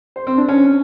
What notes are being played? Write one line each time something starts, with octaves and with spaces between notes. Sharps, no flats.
C5
C4
D4
C#4